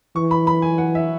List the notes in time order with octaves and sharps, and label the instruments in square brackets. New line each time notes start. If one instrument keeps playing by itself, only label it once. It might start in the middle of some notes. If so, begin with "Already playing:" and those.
[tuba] E3 [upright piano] C#6
[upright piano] B5
B5
G#5
F#5
E5